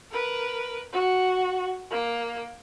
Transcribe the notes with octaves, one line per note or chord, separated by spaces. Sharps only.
A#4 B4
F#4
A#3